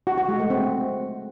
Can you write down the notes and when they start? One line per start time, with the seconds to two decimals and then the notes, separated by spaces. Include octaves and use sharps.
0.07 F#4
0.18 F#4
0.29 G#3
0.39 A3
0.50 C4